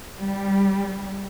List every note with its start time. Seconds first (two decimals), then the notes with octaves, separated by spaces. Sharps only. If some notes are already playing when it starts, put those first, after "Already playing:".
0.18 G3